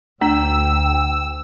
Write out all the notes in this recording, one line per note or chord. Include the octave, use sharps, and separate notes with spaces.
D2 A3 D4 G5 E6